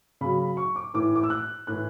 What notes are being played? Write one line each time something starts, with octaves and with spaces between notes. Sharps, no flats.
C#3 F#3 B5
C#6
D6
A2 E3 D6
D6
E6
F#6
A2 E3 F#6